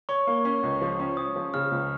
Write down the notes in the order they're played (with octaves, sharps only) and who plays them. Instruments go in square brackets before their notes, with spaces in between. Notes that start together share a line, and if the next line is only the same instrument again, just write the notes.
[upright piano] C#5 [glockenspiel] C#6
[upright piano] A#3
C#4
C#2
F3
C#4
[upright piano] C#4 [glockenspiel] D#6
[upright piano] F3
[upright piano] C#3 [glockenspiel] F6
[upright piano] C#2